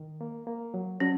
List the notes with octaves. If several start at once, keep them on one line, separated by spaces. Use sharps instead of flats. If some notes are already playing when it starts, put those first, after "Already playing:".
Already playing: D#3
A#3
A#3
F#3
F#3 C#4